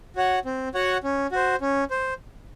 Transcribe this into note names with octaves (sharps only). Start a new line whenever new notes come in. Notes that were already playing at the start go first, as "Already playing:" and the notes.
F#4 C#5 F#5
C4
F#4 C#5 F#5
C#4
F#4 C5
C#4
C5